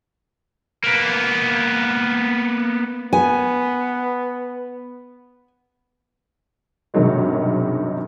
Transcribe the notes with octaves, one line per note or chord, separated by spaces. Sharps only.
A#3 B3
B3 G#5
B1 G2 C3 D#3 F#3 G#3